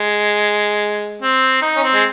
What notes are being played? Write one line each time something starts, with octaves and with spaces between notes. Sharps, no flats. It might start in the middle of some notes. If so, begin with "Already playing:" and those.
Already playing: G#3
C4
D#4
C#4
C4
G#3